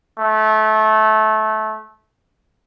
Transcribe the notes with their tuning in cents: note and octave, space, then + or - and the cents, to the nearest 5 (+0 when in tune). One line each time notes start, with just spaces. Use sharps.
A3 -20